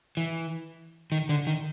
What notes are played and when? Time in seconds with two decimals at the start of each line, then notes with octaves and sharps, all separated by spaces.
0.17 E3
1.12 D#3
1.29 D3
1.47 D#3